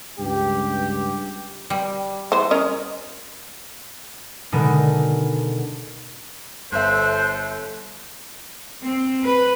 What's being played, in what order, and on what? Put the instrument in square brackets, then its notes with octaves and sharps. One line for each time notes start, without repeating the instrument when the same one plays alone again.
[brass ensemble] C#2 G2 G4
[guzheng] G3
[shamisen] E3 C5
C#4 A#4 D#5
[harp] B2 D3 D#3 G#3 D4 D#4
[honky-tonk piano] G1 E5 [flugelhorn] A4 [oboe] C5 [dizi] F#6
[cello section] C4
B4